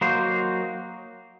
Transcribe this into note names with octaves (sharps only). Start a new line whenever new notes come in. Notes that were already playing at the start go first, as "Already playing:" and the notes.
F#3 A#3 D#4 F#4 C5